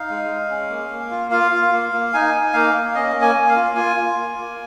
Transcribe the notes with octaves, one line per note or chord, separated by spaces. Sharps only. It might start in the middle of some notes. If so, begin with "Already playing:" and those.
Already playing: D#4 F5
G#3
G#3
C#4
A#3
A#3
F4
F4 F5
F4
A#3
A#3
D#4 G#5
D#4
A#3 F5
A#3
C#4 D#5
A#3
G#5
A#3
F5
F4
F4 G#5
F4
A#3
A#3